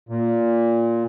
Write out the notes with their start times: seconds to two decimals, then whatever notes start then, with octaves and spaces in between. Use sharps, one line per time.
0.09 A#2